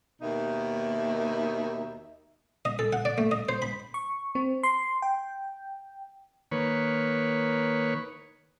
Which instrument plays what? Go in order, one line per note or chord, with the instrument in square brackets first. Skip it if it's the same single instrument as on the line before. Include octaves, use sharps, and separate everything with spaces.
[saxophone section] D#2 B2 D#3 D#4 E5
[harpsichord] D#5
A4
F#5
D5
A3
D#5
C5
B5
[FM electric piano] C#6
C4
C6
G5
[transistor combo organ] D#3 A#3 B4 C#5